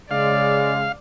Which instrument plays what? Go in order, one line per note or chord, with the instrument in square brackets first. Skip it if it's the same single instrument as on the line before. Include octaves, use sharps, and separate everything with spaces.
[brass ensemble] C#3 G#3 [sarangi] D5 [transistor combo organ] F5